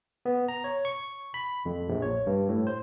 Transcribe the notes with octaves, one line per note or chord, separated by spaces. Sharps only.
B3
A#5
C#5
C#6
B5
F2
A#1
C#5
G2
A2
C5